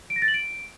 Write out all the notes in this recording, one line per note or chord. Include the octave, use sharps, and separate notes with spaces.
D7
A#6
A6
F#7
D7